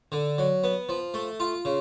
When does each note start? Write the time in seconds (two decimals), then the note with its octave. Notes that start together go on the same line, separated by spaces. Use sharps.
0.12 D3
0.38 F#3
0.63 B3
0.89 F3
1.14 A3
1.40 F4
1.65 C#3